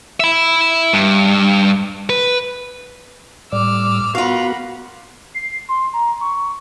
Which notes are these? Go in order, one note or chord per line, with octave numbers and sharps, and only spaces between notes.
E5 B5
G2
B4
A2 G3 D6 E6 F6
B3 F4 F#4 A#4 F5 F#5 B5
C7
C6
A#5
C#6